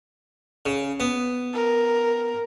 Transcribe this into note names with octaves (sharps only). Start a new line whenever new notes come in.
C#3
B3
A#4